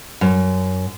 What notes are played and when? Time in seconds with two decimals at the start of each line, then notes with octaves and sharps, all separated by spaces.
0.21 F#2